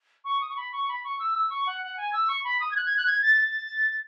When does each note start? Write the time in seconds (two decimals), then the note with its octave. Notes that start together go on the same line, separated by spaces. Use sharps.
0.25 C#6
0.41 D#6
0.49 C#6
0.57 B5
0.72 C#6
0.89 B5
1.04 C#6
1.19 E6
1.35 E6
1.50 C#6
1.66 F#5
1.82 F#5
1.97 G#5
2.13 E6
2.28 C#6
2.44 B5
2.60 D#6
2.71 G#6
2.76 F#6
2.86 G#6
2.97 F#6
3.06 G#6
3.22 A6
3.38 A6